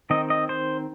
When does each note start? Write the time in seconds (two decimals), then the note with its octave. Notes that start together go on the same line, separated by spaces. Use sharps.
0.10 D#3 C4 D#5
0.30 D#5
0.49 C5